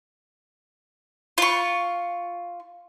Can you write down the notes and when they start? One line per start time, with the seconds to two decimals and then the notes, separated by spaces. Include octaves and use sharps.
1.38 F4 C#6